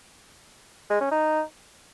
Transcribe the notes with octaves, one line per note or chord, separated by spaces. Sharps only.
G#3
C#4
D#4